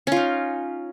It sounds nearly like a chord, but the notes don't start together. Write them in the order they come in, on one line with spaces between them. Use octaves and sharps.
C#4 F4 D#4